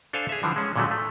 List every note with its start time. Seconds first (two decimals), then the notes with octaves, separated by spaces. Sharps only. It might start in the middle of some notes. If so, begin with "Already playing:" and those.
0.13 D4 A4 C5 F5 G#5
0.29 G#4 E5
0.43 D3 E3 F3
0.56 G#3 C#4
0.76 A#2 D3 F#3 G#3 A3
0.91 A3